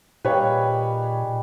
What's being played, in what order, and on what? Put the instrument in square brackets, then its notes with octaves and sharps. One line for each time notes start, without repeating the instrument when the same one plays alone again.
[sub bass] A#2 [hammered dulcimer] D#3 G3 G#4 [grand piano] B4 C#5 F5